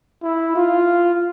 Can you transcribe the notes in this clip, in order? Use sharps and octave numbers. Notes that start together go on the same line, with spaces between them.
E4
F4